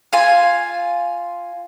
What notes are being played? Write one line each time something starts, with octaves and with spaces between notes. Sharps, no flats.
F4 G#5